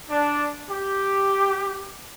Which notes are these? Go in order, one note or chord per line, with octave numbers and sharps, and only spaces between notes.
D4
G4